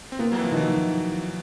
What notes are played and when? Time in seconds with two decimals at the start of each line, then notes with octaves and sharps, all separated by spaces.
0.12 C4
0.19 A#3 B3
0.32 F#3
0.36 E3 A#3
0.44 F3
0.51 D#3
0.57 F#3
0.68 D#3